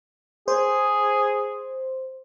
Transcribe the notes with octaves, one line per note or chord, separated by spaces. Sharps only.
G#4 C5